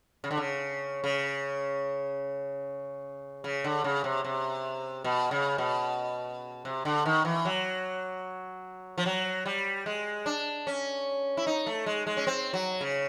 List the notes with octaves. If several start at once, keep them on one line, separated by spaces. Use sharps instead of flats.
C#3
D3
C#3
C#3
C#3
D3
C#3
C3
C3
B2
C#3
B2
C3
D3
D#3
E3
F#3
F3
F#3
G3
G#3
D4
C#4
E4
D#4
A3
G#3
G#3
C#4
C4
F#3
C#3